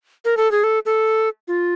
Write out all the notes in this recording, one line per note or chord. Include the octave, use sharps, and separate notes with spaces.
A#4
A4
G#4
A4
A4
F4